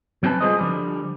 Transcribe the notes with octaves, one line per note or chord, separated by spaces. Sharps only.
F#3 C4 C#4 B4 A5
G3 F4 G#4 C5 D#5
D3 F3 G3